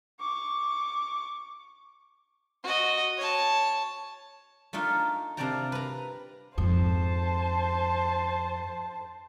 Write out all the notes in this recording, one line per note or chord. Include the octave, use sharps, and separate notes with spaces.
C#6 D6
F#4 D#5
C#5 A5
A3 D4 D#4 F4
C3 D4 F4 D5 G5 A#5
B4 A#5
F2 G#2 C5 A5